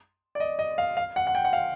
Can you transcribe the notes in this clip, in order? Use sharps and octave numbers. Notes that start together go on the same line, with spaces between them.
D5
D#5
D#5
F5
F5
F#5
F#5
G5
F#5
F5